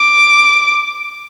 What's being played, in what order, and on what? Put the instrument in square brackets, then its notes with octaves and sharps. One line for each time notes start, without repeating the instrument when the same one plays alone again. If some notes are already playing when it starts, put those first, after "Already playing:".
Already playing: [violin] D6